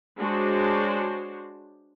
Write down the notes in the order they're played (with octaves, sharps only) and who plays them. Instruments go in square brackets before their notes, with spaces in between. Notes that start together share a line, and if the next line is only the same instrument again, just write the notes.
[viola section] G#3 D4 F#4 C5 C#5